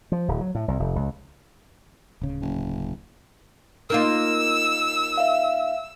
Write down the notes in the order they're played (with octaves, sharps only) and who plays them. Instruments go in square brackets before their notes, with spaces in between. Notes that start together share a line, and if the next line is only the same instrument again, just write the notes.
[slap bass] F3
D1
F#3
A2
C2
F1
C#2
[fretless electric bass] D1 C#3
[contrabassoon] F#1
[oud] A#3 D#4 F4 [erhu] E6
[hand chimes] E5 F5